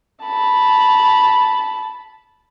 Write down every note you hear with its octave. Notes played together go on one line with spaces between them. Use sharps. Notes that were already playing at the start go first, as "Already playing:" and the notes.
A5 B5